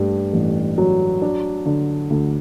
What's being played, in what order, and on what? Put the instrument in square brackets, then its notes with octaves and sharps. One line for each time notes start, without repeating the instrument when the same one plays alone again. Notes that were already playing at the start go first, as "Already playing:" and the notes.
Already playing: [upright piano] G2 A3
A1
F#3
D4
D3
D2